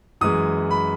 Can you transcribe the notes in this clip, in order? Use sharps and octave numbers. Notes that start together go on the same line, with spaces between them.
F#2 E3 G#3 D#6
B5